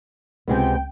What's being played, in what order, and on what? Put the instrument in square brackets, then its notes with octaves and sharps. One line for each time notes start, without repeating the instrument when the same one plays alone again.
[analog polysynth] C#2 G5 [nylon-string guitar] C3 G#3 B3